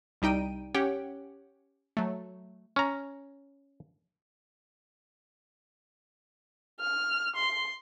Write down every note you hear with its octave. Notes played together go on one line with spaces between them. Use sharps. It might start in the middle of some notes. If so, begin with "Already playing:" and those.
C2 G3 D#4 G5 D7 D#7
C#4 G4 C#5 F#5 G5
F#3 A3
C#4 A#5
F6
C6